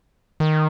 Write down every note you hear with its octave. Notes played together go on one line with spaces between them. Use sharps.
D#3